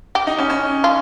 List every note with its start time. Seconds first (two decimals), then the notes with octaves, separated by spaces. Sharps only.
0.15 G4
0.27 D#4
0.38 C#4
0.50 C#4
0.84 F4